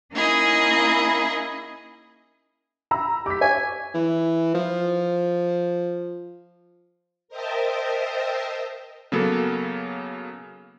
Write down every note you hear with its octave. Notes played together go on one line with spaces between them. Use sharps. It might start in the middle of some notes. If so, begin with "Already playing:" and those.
A#3 C#4 D#4 E4 G#4 D#5
A#5 B5 E6
G4 D6 B6
C#5 G#5
E3
F3
A#4 C5 D#5 E5 G5 A5
C#3 F#3 A#3 B3 A4